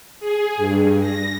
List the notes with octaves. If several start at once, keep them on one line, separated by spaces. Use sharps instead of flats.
G#4
G2
A#6